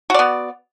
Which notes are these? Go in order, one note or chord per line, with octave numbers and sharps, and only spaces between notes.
B3 F#4 D5